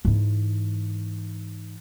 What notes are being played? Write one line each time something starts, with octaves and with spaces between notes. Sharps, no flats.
G#2 E3